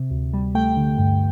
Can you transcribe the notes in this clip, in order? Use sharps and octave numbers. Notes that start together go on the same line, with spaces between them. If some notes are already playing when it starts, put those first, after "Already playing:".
Already playing: C3
D2
G3
A3 G5
D3
G2